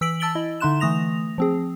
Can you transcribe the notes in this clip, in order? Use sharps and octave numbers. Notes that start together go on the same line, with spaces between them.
E3 E6 B6 D7 F#7
A5 E6 A6 D7 F#7 G7
E4 D#5
D3 D#4 E5 C6 F#6 E7
E3 A3 D#6 A#6 F7
F3 C4 G#4